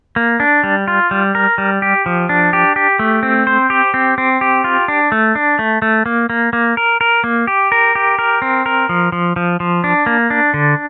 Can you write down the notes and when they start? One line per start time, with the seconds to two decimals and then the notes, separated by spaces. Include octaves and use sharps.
0.16 A#3
0.40 D4
0.64 G3
0.88 F4
1.11 G3
1.35 A#4
1.58 G3
1.82 G4
2.06 F3
2.29 D4
2.53 G4
2.76 G4
2.99 A3
3.23 C4
3.47 C5
3.70 G4
3.94 C4
4.18 C4
4.41 G4
4.64 F4
4.88 D4
5.12 A3
5.35 D4
5.59 A3
5.82 A3
6.06 A#3
6.30 A#3
6.53 A#3
6.77 A#4
7.01 A#4
7.24 A#3
7.47 G4
7.72 A#4
7.95 G4
8.19 A#4
8.42 C4
8.66 A#4
8.89 F3
9.12 F3
9.36 F3
9.60 F3
9.84 D4
10.06 A#3
10.30 D4
10.54 D3